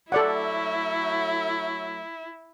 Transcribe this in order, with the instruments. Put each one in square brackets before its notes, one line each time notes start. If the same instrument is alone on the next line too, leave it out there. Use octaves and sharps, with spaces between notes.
[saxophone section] F#3 A3 [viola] E4 [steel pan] A4 D5 F#5